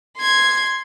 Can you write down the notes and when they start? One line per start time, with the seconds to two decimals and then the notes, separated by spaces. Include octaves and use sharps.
0.18 C6 G#6